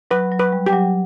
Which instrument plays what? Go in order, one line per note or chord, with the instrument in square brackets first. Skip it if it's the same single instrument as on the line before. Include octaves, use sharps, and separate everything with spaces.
[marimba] F#3 [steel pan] B4
[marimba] F#3
[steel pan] B4
[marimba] G3
[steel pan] G4
[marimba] F#3